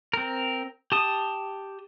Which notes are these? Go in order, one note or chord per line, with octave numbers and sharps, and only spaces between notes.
C4 A#4
G4 A5 D#6